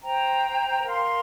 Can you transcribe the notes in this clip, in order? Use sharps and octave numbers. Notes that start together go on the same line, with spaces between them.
C5 G5 A#5
A#4 F5 C6